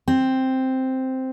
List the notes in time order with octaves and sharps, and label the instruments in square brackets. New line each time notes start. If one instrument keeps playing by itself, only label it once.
[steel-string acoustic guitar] C4